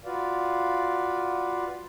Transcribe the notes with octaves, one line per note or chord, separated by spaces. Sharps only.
F4 F#4 B4 D5 F5